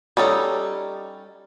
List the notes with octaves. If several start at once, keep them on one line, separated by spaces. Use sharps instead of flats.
G3 C#4 D#4 A4